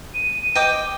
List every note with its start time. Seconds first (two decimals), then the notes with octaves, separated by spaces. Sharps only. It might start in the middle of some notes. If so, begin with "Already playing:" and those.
0.14 D#7
0.55 D#5 G5 D6